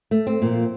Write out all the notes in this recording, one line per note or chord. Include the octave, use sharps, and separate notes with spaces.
A3
C4
A#2 F3